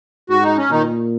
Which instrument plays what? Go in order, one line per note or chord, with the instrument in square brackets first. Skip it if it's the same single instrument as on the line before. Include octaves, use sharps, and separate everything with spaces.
[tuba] G#2 [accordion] F#4
[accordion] D#4
C#4
[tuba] A#2 [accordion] D#3 D#4